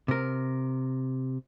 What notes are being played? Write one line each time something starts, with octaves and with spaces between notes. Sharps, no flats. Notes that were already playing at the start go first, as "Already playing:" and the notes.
C3 A#4